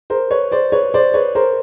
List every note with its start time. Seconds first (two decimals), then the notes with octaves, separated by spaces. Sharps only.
0.10 A#4 C5
0.31 B4 C#5
0.52 C5 D5
0.72 B4 C#5
0.94 C5 D5
1.14 B4 C#5
1.35 A#4 C5